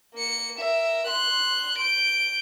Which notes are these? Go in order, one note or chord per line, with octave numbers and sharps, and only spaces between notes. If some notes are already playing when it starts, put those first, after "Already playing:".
A#3 C#7
A#4 E5
C6 F#6
G6 D7